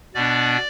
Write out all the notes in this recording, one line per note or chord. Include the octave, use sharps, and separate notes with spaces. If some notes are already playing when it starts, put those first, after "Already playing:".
B2 B3 D4 D5